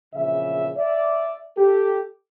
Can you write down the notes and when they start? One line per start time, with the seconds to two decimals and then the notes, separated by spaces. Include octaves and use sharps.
0.14 A#1 E2 C#3 E5
0.76 D5 E5
1.57 G4 A4